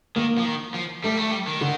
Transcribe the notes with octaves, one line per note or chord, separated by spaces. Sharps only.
D#3 A#3
F3
D#3
F3
G3 A3
A3
G3
D#3
D3